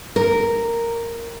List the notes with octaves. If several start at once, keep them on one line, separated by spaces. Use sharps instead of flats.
A#4